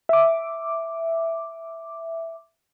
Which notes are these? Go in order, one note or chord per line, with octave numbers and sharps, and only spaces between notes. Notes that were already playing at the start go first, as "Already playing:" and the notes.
E5 D6